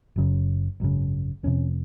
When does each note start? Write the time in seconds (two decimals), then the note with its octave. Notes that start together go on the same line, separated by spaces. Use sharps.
0.16 F#1 F#2 C#3
0.80 G#1 F#2 C#3
1.43 F1 F2 C3 C#4